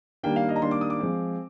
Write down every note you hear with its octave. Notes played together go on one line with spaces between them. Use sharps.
D#3 G3 A#3 D4 G5
F5
D#5
A#5
D#3 G3 A#3 D4 C6
D6
D#6
D6
F3 G#3 C4